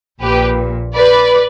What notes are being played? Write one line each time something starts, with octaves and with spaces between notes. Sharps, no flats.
A#1 A#2 G4 B4
B4 D5